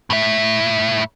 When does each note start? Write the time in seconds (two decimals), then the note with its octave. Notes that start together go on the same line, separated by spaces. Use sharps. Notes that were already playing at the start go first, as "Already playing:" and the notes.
0.10 A2 E5